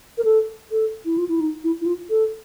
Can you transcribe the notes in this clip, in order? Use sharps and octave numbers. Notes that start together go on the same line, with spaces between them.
A#4
A4
A4
E4
F4
E4
D#4
E4
E4
F4
A4